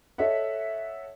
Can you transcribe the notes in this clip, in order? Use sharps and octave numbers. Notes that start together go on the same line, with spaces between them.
A4 C#5 D#5 E5 F#5